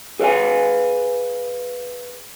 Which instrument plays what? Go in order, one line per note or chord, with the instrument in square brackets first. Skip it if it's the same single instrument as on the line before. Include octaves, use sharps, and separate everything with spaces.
[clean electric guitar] G#4 B4 C5 F5 G#5